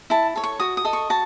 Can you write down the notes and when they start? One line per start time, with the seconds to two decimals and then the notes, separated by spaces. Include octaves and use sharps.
0.10 E4 A5
0.36 A4 C#5
0.44 C#6
0.60 F#4 D#6
0.77 D#6
0.85 A4 D#5
0.93 C#6
1.10 F#4 A5